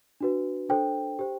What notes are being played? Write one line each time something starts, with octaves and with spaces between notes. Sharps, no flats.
D4 F#4 B4
D4 A4 C5 G5
G4 C5